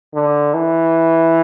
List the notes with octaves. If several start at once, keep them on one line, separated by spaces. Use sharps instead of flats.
D3
E3